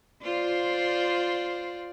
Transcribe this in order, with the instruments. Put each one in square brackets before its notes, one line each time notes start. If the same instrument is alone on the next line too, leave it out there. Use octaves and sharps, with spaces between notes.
[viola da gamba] F4 C5 D5